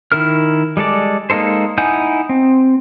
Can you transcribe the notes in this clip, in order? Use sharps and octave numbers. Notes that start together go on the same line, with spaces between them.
D#3 E4 A#4 F6
G3 G#3 A4 D5
G#3 A#3 D#4 A4 C5
D#4 E4 F#5 G#5 G6
C4